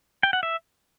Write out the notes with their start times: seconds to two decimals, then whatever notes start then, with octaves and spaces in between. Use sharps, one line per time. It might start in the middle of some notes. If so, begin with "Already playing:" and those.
0.23 G5
0.33 F#5
0.43 E5